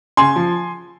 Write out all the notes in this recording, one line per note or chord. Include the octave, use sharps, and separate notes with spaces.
C#3 G#5 C6
F3